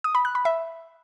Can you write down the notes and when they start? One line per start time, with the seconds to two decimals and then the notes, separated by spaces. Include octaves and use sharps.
0.04 D#6
0.15 B5
0.25 F#6
0.35 B5
0.45 E5